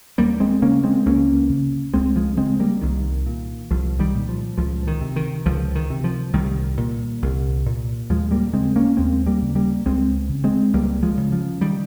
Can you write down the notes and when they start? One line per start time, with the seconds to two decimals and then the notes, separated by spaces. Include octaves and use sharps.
0.18 D#2 G3 A#3
0.40 G#3 C4
0.62 C#3 A#3 C#4
0.84 G#3 C4
1.06 C#2 A#3 C#4
1.49 C#3
1.94 C#2 G#3 C4
2.16 F3 G#3
2.38 C#3 G#3 C4
2.60 G3 A#3
2.81 C2 D#3
3.26 A#2
3.70 C2 F3
3.99 D#3 G3
4.14 A#2
4.29 F3
4.57 C#2 F3
4.87 D#3
5.01 C3
5.16 D#3
5.46 C#2 F3
5.75 D#3
5.90 C3
6.04 F3
6.33 C2 D#3 G3
6.77 A#2
7.22 C2
7.66 A#2
8.10 D#2 F3 G#3
8.31 G3 A#3
8.53 C#3 G#3 C4
8.76 A#3 C#4
8.97 D#2 G#3 C4
9.27 G3 A#3
9.42 C#3
9.55 G3 A#3
9.86 C#2 G#3 C4
10.29 C#3
10.44 G#3 C4
10.73 C#2 G3 A#3
11.03 F3 G#3
11.17 C#3
11.32 F3
11.61 D#3 G3